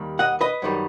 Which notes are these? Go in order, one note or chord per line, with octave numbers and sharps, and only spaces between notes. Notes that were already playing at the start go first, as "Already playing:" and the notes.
Already playing: D#2 D#3 G3
D#5 F#5
B4 D#5
F#2 D#3 G3